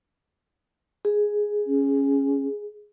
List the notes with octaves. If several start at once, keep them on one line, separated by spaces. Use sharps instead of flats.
G#4
C#4